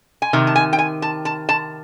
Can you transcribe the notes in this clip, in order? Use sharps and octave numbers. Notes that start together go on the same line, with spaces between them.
G#5
C3 D#3
A5
G#5
G5
G#5
A5
A5
A5